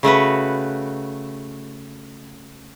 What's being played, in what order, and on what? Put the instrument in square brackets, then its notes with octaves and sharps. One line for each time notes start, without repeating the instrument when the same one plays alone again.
[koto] C#3 A3 F#4 B4